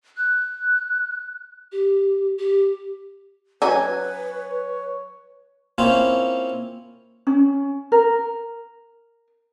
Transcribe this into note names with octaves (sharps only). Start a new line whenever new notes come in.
F#6
G4
G4
F#3 C#4 D#4 B4 G#5
C#5
A#3 C4 C#4 E4 F4
C#4
A#4